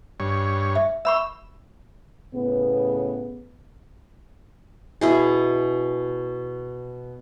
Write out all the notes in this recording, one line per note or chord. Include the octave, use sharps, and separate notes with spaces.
G2 C#5
E5
E5 B5 C#6 E6
A2 C#3 B3
B2 E4 G#4